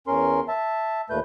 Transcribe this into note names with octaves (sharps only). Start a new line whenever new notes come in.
E2 C#4 A#4 C6
E5 A5
D#2 A#2 A3 B4 G6